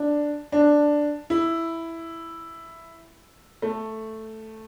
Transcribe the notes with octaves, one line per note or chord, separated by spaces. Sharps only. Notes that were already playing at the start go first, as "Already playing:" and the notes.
Already playing: D4
D4
E4
A3